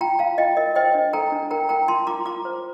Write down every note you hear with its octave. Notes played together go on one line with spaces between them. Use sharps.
F4 G5 A#5
F4 F5 A5
F4 D#5 G5
A#4 D#5
C5 D#5 G5
D4
A4 G5 A#5
D4
A#4 G5 A#5
A#4 G5 A#5
F4 A5 C6
F4 A#5 D6
F4 A#5 D6
C5